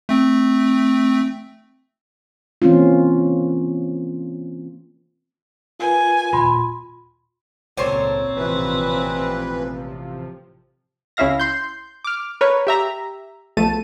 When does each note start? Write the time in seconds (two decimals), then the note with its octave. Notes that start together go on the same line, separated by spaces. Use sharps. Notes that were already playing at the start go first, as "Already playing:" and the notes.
0.09 A3 C4
2.62 E3 A#3 C4 C#4 F4
5.80 F4 A#4 B4 G#5
6.33 D#2 A#2 F4 B5 C6
7.77 G#1 C#2 A#2 C4 A4 C5 C#5
8.36 A1 C3 E3 F3 B4
11.17 C#2 C#4 E4 E5 F5 A#6
11.39 C6 G6
12.04 D6 F6
12.41 A#4 B4 C#5
12.67 G4 E5 A#5
13.57 B1 B2 F3 A3 A5 D#7